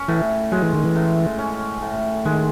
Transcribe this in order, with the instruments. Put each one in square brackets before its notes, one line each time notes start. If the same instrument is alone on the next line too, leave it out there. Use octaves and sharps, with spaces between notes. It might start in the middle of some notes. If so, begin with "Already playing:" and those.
Already playing: [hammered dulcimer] C#4
[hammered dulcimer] A2 [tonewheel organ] E3
[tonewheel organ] F#3 [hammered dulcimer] G#3
[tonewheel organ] E3
D#3
E3
[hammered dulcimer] A2
C#4
A2
[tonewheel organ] D#3 [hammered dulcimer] G#3